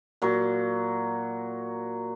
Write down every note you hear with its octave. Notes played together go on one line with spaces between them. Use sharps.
A#2 F#3